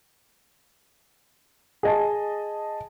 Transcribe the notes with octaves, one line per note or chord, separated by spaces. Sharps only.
G#4 D#5 A5